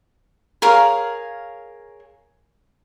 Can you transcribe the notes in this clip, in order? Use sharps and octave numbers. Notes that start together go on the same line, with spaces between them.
G#4 A#4 C#5 F5